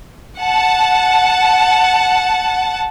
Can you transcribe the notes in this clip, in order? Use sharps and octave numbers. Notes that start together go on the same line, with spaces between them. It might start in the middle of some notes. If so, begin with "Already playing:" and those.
F#5 A5